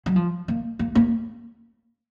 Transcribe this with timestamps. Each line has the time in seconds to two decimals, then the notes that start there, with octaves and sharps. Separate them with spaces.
0.06 F#3
0.16 F3
0.48 A#3
0.79 A#3
0.95 A#3